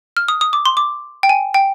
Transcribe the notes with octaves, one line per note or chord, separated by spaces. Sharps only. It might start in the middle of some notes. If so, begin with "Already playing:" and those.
F6
D#6
D#6
D6
C6
D6
G5
G#5
G5